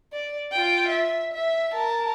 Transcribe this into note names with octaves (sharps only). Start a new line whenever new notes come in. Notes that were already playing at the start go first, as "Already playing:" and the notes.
D5
F4 G5
E5
E5
A#4 A5